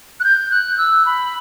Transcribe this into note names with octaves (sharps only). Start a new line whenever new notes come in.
F#6
G6
F#6
E6
B5